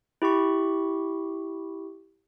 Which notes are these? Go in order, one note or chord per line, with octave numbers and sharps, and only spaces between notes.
E4 G4 B5 C#6